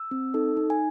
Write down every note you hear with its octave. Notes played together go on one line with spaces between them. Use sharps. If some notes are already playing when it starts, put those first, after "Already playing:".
Already playing: E6
C4
D#4 A4
D#4
G#5